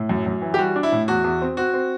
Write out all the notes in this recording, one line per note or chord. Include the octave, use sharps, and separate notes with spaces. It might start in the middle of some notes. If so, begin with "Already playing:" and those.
Already playing: A2
F#2
F#2
E3
G4
G3 F#4
D4
E4
A2
E2 F#4
E2
C4
C4 F#4
C4